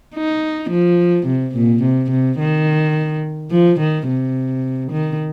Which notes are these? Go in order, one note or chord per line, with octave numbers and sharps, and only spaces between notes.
D#4
F3
C3
A#2
C3
C3
D#3
F3
D#3
C3
D#3